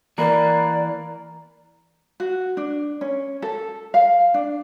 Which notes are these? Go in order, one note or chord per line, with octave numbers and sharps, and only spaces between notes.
E3 A#3 A#4 B4 D5
F#4
D4
C#4
A4
F5
D4